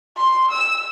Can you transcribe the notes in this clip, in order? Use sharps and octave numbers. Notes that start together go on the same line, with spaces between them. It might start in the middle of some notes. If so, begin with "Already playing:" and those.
C6
E6